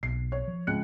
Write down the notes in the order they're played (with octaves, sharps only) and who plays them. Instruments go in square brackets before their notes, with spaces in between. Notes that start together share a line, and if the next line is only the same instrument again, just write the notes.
[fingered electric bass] B1 [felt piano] C7
[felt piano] C#5
[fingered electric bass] F3
[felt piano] C#2 F#6 C#7